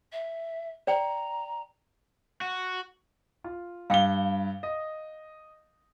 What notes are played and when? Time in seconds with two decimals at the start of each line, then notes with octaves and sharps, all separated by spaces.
0.12 E5
0.87 D5 G5 A#5
2.41 F#4
3.44 F4
3.90 G2 F5 G5 G7
4.63 D#5